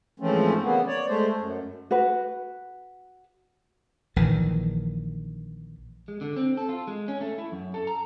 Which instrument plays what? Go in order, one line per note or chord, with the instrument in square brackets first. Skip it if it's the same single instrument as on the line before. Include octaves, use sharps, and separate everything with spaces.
[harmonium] G#2 E3 F3 A3 C4 C#4
C#3 A#3 B3
C#5 D5
G#3 A3 C5
F#2
[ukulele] F#4 B4
[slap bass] A#1 D#3 E3
[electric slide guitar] G#3
D3
C4
A4
F4
G#3
C#4
A3
E4
F#2
A4
A#5